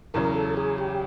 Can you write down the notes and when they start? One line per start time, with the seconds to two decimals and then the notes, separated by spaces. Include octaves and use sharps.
0.14 E2 C#3 F#3 A#4
0.35 A4
0.57 G#4
0.78 G4